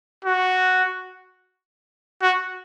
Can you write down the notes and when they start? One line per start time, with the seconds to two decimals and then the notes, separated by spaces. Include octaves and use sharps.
0.25 F#4
2.22 F#4